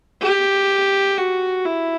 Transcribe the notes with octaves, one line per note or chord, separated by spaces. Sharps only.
G4
F#4
E4